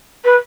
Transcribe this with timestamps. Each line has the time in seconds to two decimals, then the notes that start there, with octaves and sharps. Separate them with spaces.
0.25 B4